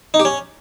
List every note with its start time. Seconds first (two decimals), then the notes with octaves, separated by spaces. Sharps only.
0.14 D#4
0.20 G4
0.25 C#4